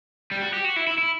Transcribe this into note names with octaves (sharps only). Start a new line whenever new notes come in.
G3
F#4
G4
F#4
E4
E4
E4